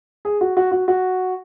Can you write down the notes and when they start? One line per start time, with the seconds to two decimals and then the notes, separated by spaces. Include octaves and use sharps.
0.25 G#4
0.41 F#4
0.57 F#4
0.71 F#4
0.88 F#4